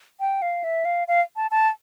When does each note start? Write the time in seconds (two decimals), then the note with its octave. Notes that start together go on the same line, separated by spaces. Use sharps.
0.20 G5
0.42 F5
0.64 E5
0.85 F5
1.08 F5
1.36 A5
1.51 A5